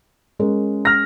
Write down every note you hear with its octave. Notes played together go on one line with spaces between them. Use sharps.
G#3 C#4 A#4
F6 A#6